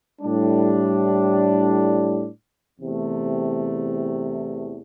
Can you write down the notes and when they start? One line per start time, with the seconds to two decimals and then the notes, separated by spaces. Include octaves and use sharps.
0.21 A2 G3 D4
2.79 E2 C3 A3